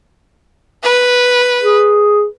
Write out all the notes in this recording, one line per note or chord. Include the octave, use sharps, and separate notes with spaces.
B4
G#4